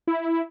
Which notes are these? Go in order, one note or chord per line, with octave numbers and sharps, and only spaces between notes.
E4